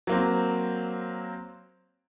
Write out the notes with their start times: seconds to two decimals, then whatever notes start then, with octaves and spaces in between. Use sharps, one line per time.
0.07 F#3 A#3 C4